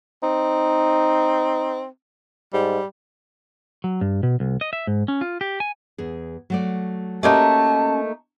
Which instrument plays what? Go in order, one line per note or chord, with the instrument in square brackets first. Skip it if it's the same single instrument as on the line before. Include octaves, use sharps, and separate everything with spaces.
[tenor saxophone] C4 [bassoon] D#4
[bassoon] G#2 [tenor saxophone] G3
[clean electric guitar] F#3
G2
B2
C2
D#5
E5
G#2
C#4
F4
G4
G#5
[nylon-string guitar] E2 G#4
F#3 A3 D5
[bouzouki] A3 A#3 D#4 [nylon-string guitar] C#4 F#4 G4 [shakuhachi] A5